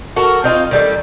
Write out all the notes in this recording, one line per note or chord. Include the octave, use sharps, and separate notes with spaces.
F#4 A4 A#4
C4 D#4 F4
D#3 G3 A4